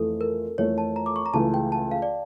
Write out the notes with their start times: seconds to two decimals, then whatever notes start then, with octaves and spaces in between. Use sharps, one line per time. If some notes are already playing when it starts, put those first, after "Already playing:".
Already playing: F2 E3 A3 A4
0.21 A#4
0.58 F2 E3 A3 C#5
0.78 A5
0.96 A#5
1.06 D6
1.16 C#6
1.26 A#5
1.34 C#2 C#3 E3 A3 A5
1.54 G5
1.72 A5
1.91 F5
2.02 D5